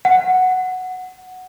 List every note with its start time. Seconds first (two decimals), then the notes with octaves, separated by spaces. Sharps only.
0.05 F#5